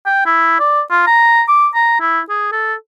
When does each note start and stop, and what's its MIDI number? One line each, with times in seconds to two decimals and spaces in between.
0.06 0.25 79
0.26 0.58 64
0.60 0.81 74
0.90 1.05 65
1.07 1.43 82
1.48 1.68 86
1.75 1.97 82
2.00 2.20 64
2.29 2.49 68
2.52 2.74 69